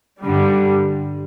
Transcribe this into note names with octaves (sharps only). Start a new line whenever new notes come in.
G2 D3 G3